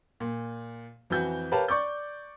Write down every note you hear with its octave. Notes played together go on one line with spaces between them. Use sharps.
A#2
F2 E3 F#4 G6
G4 A#4 B4 C#5 F5 A5
D5 C#6 D6 G6